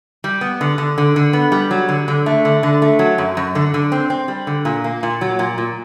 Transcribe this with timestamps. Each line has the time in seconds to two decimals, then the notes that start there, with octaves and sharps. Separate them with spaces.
0.24 G3
0.41 B3
0.61 D3
0.78 D3
0.98 D3
1.16 D3
1.33 B3
1.52 G3
1.71 F#3
1.89 D3
2.08 D3
2.26 A3
2.45 D3
2.63 D3
2.82 A3
2.99 F#3
3.18 F#2
3.37 F#2
3.55 D3
3.74 D3
3.92 C4
4.10 C4
4.28 G3
4.47 D3
4.65 A#2
4.84 A#3
5.03 A#2
5.21 F#3
5.39 A#2
5.58 A#2